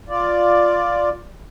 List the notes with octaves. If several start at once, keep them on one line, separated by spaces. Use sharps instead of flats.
F4 D5